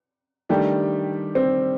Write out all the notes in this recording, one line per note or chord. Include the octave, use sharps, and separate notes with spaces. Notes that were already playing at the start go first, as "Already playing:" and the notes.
D#3 G3 A3 D4 G4
C4